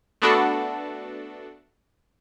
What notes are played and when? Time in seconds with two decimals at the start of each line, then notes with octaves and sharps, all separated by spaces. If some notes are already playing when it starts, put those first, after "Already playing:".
0.22 A3 B3 D4 F#4 A4